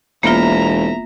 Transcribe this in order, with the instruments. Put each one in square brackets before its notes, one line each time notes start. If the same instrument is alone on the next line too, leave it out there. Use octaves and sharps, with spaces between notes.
[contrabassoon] E1 [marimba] A#3 B3 F4 [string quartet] E5 A#5